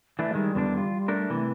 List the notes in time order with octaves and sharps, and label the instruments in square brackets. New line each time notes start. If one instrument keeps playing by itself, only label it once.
[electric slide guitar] E3 A3 D4 [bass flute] E5
[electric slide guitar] D#3 G#3 [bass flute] G3
[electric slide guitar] E2 D3 D4
F4
A3 D4 A#4
[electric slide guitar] C3 E3 [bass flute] A3